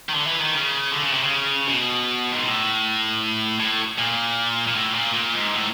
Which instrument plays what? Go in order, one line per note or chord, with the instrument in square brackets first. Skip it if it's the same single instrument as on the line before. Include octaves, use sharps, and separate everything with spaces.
[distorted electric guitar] D#3
D3
E3
D#3
C#3
D3
C#3
C3
C#3
B2
G#2
A2
A2
A#2
A#2
A2
A#2
A#2
G#2
A2